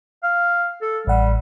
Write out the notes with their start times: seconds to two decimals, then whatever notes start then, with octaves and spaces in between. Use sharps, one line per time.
0.23 F5
0.82 A4
1.07 A1 G3 F#5